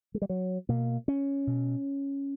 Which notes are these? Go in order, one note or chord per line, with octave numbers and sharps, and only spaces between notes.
G#3
G3
F#3
B2 A#3
C#4
B2